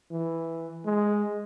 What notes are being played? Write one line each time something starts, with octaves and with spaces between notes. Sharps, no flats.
E3
G#3